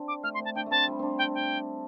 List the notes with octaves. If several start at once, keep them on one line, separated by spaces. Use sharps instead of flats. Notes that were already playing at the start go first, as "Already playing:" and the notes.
Already playing: C4 D4
D6
A3 F6
C6
C4
A5
D4 G5
A3 C4 A5
G3
C4 D4
G5
G5